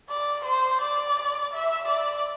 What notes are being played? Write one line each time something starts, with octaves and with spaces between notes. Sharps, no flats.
D5
C5
D5
E5
D5